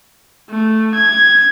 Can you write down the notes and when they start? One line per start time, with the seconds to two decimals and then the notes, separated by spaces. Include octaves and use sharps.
0.50 A3
0.94 G#6